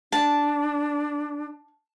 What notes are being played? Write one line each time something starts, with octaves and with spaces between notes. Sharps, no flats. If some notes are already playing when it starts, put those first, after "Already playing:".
D4 A5